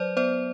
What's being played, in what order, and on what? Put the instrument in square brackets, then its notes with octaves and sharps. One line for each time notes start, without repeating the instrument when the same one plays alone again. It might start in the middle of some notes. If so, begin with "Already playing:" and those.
Already playing: [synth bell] F#3 C5 D5
B3 C5 D5